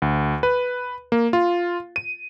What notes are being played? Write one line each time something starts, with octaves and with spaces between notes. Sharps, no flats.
D2
B4
A#3
F4
D#7